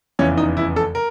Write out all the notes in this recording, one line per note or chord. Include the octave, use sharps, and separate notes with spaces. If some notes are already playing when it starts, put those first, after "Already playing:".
F1 E2 C#3 E3 C#4
D#4
E4
A4
A#4